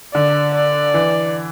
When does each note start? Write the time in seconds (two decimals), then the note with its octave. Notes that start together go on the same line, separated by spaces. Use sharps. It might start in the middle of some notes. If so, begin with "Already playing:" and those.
0.14 D3 D5
0.55 D5
0.94 E3